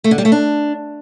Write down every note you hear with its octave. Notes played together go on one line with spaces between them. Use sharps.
A3
D3
G3
A3
D4